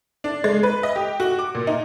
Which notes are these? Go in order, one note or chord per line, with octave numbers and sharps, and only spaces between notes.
D4
G#3
B4
D#5
G4
F#4
D6
A#2
D#4